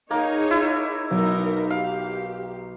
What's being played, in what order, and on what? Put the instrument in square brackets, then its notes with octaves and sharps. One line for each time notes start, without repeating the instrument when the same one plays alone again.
[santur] A#3 [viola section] D#4 G#4 C#5 [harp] G5 A#6
[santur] E4
[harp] B1 [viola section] D#4 A#4
[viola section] G4 [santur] F5 [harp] G5